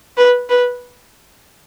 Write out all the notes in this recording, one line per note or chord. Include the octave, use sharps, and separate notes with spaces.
B4
B4